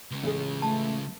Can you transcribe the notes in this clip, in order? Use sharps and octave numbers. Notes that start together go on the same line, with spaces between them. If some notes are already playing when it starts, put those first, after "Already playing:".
C#2 C#3
A1 G#4
A3 A5